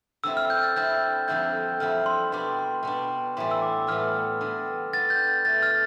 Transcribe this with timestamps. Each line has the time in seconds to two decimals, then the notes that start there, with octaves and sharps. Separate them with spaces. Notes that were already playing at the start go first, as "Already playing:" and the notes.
0.24 D3 G3 C4 E4 E6
0.37 F6
0.50 G6
0.63 A6
0.76 D3 G3 C4 E4 G6
1.28 F2 D3 G3 C4 E4 G6
1.80 F2 D3 G3 C4 E4 F6
2.06 C6
2.32 B2 G3 D4 C6
2.59 C6
2.83 B2 G3 D4
3.37 A2 E3 G3 B3 C6
3.51 E6
3.62 D6
3.87 A2 E3 G3 B3 F6
4.41 D3 G3 B3
4.93 D3 G3 B3 A6
5.10 G6
5.28 G6
5.45 B2 A3 D4 A6
5.63 F6